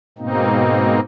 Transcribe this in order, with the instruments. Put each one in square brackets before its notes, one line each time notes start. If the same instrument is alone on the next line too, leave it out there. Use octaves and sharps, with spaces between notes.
[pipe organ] G#2 B2 A#3 C4 D#4